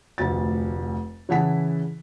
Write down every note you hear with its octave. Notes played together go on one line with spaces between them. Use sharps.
F1 D2 A6
C#3 E3 E4 F#5 A5 B6